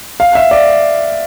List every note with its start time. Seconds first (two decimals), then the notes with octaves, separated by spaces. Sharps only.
0.20 F5
0.35 E5
0.51 D5